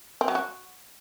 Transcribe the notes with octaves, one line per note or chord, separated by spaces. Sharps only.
C4
F#3
F#4